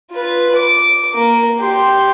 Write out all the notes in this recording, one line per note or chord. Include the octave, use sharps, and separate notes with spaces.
F4 B4
D6
A#3
G4 C6